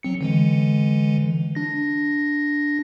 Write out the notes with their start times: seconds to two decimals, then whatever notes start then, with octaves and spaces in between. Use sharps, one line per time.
0.03 F#3 C4 C#7
0.21 D3 E3 G#3
1.55 D4 A#6